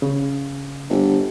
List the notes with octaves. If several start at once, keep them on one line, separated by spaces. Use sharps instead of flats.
C#3
G1